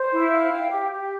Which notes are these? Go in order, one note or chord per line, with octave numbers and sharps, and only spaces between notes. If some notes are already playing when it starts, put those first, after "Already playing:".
Already playing: C5
E4
F5
G5
G4
G4